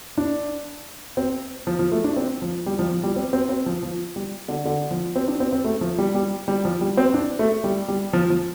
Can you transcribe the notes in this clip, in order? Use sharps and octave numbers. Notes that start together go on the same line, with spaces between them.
D4
C4
F3
F3
A3
D4
C4
F3
G3
F3
F3
G3
C4
C4
C4
F3
F3
G3
D3
D3
F3
C4
D4
C4
C4
A3
F3
G3
G3
G3
F3
G3
C4
D4
A3
G3
G3
F3
F3